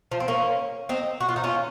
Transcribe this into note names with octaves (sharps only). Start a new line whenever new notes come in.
F3
C4
A#3 C#4
C4 D#4
F#4
F4
D#4
C#4 F4